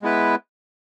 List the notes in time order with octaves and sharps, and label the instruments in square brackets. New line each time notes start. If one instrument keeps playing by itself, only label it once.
[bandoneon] G#3 B3 E4 B4